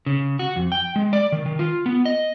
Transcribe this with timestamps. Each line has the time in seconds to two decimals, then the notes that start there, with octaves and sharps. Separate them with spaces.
0.06 C#3
0.39 F#4
0.56 F2
0.72 G5
0.96 G#3
1.13 D5
1.32 D#3
1.46 D#3
1.59 F4
1.86 B3
2.05 D#5